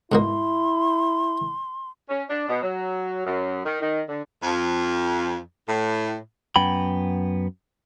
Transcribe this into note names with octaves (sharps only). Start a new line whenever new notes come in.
G#2 B2 A#3 E4 C6
C#4
D4
B2
F#3
F#2
D#3
D#3
D3
F2
A2
F#2 B3 G5 B5